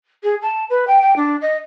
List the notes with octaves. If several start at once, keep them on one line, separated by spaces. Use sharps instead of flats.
G#4
A5
B4
G5
G5
D4
D#5